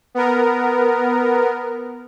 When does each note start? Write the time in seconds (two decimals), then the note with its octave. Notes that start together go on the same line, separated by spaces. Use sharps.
0.15 B3 A#4